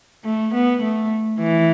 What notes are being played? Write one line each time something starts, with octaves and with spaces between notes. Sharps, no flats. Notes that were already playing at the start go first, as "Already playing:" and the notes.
A3
B3
A3
E3